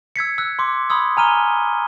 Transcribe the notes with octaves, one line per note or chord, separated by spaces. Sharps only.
E6 G#6 B6 C#7
E6 F#6
C6 D6
B5 C6 D#6 E6 G#6
G#5 A#5 F6 D#7 G7